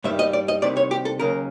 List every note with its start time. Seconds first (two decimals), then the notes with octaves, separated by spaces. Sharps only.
0.04 G2 D#3 G3 E5
0.19 D#5
0.33 D5
0.48 D#5
0.62 C2 C3 D#3 D5
0.77 C#5
0.91 G4
1.05 A4
1.20 D#2 C#3 F#3 A#4